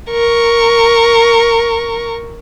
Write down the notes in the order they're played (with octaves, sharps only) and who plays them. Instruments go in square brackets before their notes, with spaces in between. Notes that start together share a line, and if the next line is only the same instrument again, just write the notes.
[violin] A#4 C#6